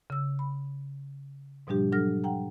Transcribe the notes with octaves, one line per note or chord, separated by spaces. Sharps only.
C#3 E6
B5
G#2 B2 F3 G3 D4 G4
F#3 D4 A4 F6 A#6
F#5 G5 A#5